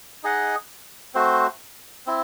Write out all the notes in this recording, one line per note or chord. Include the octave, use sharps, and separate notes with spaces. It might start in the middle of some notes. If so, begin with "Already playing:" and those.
D#4 G#4 D#5 F#5
A3 C4 F#4 C5
C4 E4